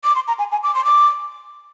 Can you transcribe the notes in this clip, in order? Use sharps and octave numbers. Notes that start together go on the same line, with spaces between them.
D6
C6
A#5
G#5
G#5
D6
C6
D6